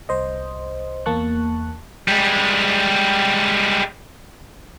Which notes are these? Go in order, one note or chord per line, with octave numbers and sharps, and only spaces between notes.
C2 C5 D#5
E2 A#3 A5 C#6 F#6
G3 G#3